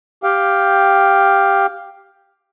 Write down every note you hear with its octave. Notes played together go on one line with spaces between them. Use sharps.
G4 F5 G5